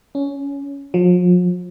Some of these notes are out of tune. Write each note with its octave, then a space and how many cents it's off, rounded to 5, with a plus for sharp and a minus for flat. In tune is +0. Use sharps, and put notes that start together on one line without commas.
C#4 +15
F3 +40